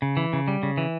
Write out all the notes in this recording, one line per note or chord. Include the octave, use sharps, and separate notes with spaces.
C#3
E3
C#3
G3
C#3
E3